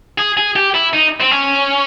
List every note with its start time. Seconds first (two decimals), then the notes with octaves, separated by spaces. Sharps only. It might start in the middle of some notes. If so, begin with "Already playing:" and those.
0.18 G#4
0.37 G#4
0.56 G4
0.74 E4
0.93 D#4
1.20 C4
1.31 C#4